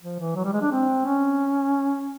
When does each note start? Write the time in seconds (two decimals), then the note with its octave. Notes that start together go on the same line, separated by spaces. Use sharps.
0.02 F3
0.19 E3
0.36 F#3
0.45 G3
0.53 G#3
0.62 D4
0.71 C4
1.05 C#4